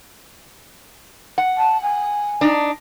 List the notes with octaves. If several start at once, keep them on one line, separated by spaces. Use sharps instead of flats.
F#5
A5
G#5
D4 D#4